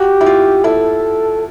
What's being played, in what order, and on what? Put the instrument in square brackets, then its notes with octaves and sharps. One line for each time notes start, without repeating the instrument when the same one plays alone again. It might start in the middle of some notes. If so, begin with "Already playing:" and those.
Already playing: [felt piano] F#4 [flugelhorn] G4
[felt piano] E4
F4
[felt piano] E4 [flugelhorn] A4